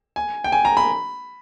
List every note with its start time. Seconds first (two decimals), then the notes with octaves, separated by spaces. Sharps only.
0.16 G#5
0.44 G5
0.52 G#5
0.65 A#5
0.77 B5